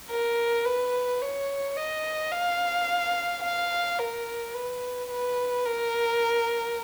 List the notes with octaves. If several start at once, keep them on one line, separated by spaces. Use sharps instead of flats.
A#4
B4
C#5
D#5
F5
F5
A#4
B4
B4
A#4